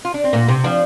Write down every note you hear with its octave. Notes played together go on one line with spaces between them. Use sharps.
F4
D4
C4
A#2 A#3
C3 C4
F3 D4